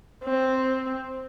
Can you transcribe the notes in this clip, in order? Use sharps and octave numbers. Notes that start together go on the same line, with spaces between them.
C4